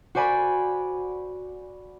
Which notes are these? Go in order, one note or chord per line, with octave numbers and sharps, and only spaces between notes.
F#4 C5 D5 G#5 B5